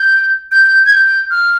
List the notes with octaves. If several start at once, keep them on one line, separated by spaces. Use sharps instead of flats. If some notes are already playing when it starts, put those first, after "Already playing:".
Already playing: G6
G6
G#6
G6
F6